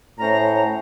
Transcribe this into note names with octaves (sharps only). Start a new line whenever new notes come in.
A2 C#4 C5 A#5